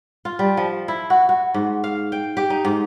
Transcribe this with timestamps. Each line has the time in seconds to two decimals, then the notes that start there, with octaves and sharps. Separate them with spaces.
0.25 F4
0.39 G3
0.57 F3
0.88 E4
1.10 F#4
1.29 F#4
1.54 G#2
1.84 F5
2.12 G5
2.37 G4
2.50 D#4
2.65 G#2